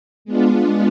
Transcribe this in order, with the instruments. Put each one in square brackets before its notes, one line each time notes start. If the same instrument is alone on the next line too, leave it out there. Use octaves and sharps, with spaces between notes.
[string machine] G#3 B3 D4 F4